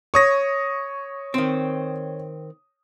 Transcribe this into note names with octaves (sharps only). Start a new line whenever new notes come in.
C#5 C#6 D#6 A#6
D#3 C4